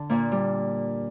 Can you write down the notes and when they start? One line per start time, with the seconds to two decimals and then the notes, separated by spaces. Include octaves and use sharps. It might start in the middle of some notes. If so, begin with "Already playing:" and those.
Already playing: D3 D4
0.10 A#2 A#3
0.32 G3